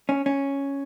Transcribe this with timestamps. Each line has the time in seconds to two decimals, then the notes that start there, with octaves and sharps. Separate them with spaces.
0.09 C#4
0.26 C#4